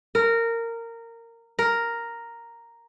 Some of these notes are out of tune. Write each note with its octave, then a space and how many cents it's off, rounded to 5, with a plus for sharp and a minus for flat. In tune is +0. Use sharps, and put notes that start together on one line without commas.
A#4 -15
A#4 +0